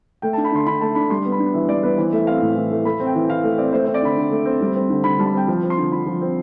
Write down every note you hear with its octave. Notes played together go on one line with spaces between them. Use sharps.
A3 G5
D4 A5
B5
D3 C6
D3 B5
A3 A5
D4 B5
G3 C6
B3
B5
D4
E3 E5
G3 D5
B3 B4
E3 C5
A3 E5
C4 F5
A2
E3
A3
A3 B5
C4
G5
E3
E3 F5
A3
C4 D5
A3 C5
C4 C5
D5
D3 B5
D3
A3
C4
G3
C4
D3
D3 B5
G3 A5
B5
C4 G5
F3
C4
C6
D3
D3 B5
F3
C4